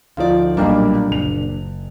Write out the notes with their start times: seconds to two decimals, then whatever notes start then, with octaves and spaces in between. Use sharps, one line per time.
0.17 D2 F3 D#4 F4 D5
0.57 B1 A#2 G3 A#3 D4
1.08 F#1 F7